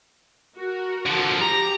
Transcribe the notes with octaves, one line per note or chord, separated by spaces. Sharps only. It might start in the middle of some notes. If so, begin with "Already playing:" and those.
F#4 A#4
D3 F3
G4 A#5